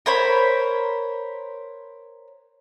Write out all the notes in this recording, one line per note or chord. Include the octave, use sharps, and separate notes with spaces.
A#4 C5 C#5 B5